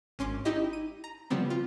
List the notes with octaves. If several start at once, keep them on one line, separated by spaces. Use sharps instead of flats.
G#1 C#4 C6 D6
D#4 E4 G4 D#5
D#7
A#5
C#3 F3 G3 B3 C4
F4